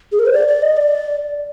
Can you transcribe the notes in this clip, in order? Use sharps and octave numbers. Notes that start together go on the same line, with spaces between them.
G#4
A#4
C5
D5
D5
D#5
D5